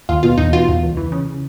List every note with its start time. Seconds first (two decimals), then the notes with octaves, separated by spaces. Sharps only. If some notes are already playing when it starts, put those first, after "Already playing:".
0.09 D#2 F4
0.23 B2 F4
0.38 E2 D#4
0.53 B2 F4
0.68 E2
0.83 C#2
0.97 E3
1.12 C#3